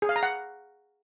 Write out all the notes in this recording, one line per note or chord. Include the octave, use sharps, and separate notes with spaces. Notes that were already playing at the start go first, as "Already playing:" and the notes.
G#4
F5
A#5
F#5